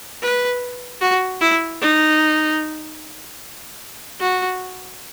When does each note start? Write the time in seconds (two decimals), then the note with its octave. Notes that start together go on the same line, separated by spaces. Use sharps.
0.23 B4
1.01 F#4
1.41 E4
1.81 D#4
4.20 F#4